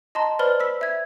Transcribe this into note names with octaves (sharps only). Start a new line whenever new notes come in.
D#5 A5 A#5 C6
B4 C5 D5 B5 F6 G7
B5 E6 B6
E5 G#6